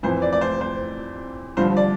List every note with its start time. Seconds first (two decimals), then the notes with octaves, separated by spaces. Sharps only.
0.03 F2 E3 C5
0.22 D5
0.33 D5
0.41 C5
0.61 C5
1.57 G2 D3 F3 C5
1.77 D5